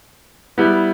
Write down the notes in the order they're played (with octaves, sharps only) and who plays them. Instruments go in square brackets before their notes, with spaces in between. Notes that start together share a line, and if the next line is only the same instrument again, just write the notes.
[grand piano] G3 B3 E4